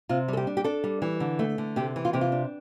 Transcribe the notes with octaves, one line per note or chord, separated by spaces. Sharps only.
C3 F4
G3 A4
G4
D4
G4
D4 A4
G3
E3
D3
A3
D3
C3 G4
E3
F4
C3 G4
F4
D4